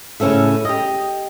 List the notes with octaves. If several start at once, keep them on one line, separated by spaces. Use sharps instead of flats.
A2 C#3 F#3 C#4 A4 E5
G4 D#5